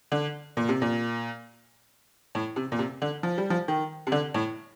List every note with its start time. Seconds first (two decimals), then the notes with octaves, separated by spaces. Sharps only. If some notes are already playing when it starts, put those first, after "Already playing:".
0.12 D3
0.57 A#2
0.69 C3
0.82 A#2
2.35 A2
2.56 C3
2.72 A#2
2.79 C3
3.02 D3
3.23 F3
3.38 G3
3.50 F3
3.68 D#3
4.07 C3
4.12 D3
4.34 A2